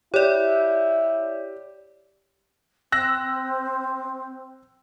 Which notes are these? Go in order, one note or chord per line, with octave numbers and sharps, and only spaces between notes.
E4 G4 C#5 D5
C4 E6 F#6 A#6